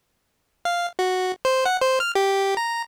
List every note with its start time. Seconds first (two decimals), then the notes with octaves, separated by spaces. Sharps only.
0.65 F5
0.99 F#4
1.45 C5
1.66 F#5
1.81 C5
2.00 F6
2.15 G4
2.57 A#5